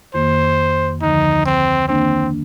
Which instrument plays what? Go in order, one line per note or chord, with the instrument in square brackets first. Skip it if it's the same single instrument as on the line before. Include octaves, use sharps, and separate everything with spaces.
[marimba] F2 D#3 A#3 [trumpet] C5
[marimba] D2 D3 F3 [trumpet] D#4
[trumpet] C4
[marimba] D#3 A#3 D4 [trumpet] C4